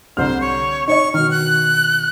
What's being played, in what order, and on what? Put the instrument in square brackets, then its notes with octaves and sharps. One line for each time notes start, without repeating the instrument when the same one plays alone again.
[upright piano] C2 D3 F6 [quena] C5
[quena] C#5
[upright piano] D#4 C#5 D#5 [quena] C#6
[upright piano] B2 D#3 [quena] F6
[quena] F#6